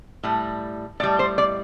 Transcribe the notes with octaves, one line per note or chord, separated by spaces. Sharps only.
A2 G3
A2 G3 D5
C5
D5